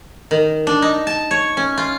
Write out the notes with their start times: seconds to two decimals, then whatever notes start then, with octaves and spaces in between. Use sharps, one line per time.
0.31 D#3
0.67 D4
0.82 D#4
1.07 A5
1.31 C#5
1.57 C#4
1.78 F4